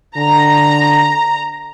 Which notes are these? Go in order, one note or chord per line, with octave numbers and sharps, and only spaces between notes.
D3 A#5